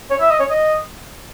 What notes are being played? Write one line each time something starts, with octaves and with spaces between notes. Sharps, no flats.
C#5
E5
D#5
C#5
D#5